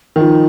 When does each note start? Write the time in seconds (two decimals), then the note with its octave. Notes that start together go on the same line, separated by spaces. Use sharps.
0.16 D#3
0.20 F3 D#4